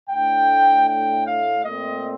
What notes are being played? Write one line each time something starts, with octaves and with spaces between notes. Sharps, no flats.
A2 A3 D4 G5
G5
F5
A#2 A3 C4 D#5